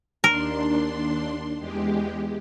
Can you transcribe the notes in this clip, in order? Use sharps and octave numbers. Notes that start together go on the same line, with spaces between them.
D#2 D4 A#4 C6
E2 G#3 G4